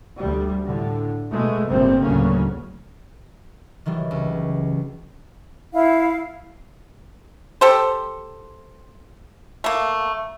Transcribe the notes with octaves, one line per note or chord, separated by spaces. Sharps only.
D2 G3
A2 D3
B2 G#3 A3
G1 A2 C3 G3 A#3 C4
D2 A2 C#3 F#3 A#3 C#4
D#3 E3 F#3 G3
C#2
E4 F5
G4 A4 C5
A3 A#3